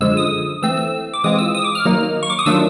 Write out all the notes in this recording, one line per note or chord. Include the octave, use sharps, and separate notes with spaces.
F#2 D3 F3 G#3 E6
D#6
E3 A3 C4 E6
E6
D6
E3 G#3 C4 F4 D#6
E6
D#6
D6
F6
D#3 F#3 A#3 D#4
C#6
D6
D#6
D#3 F#3 A3 D4 F4 E6